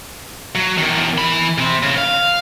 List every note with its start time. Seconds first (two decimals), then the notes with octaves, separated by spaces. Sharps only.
0.55 F#3
0.78 E2 D#3
1.18 E3 B5
1.58 C3 C4
1.83 C#3
1.98 F5